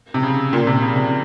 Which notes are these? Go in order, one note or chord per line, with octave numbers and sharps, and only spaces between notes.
C3
C#3
A#2
C3
C#3
C3